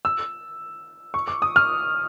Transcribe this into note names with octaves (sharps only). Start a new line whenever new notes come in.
E6
C#6
D6
D#6
F6